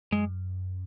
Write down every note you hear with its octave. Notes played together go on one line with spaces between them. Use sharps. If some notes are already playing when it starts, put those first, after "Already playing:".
F#2 G#3